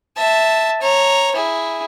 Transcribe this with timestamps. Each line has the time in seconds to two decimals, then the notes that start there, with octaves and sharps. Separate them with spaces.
0.17 E5 A5
0.82 C#5 A#5
1.35 E4 G#4